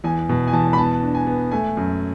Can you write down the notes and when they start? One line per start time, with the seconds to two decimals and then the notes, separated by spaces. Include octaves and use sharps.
0.04 E2 G#5
0.29 B2
0.47 G#5
0.53 E2 A5
0.73 B5
0.78 B3 A5
1.02 D4
1.15 G#5
1.27 B3
1.52 A3 G#5
1.77 F#2